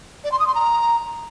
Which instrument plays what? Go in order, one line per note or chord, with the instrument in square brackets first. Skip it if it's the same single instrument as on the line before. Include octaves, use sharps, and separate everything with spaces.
[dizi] D5
C6
D#6
C6
A#5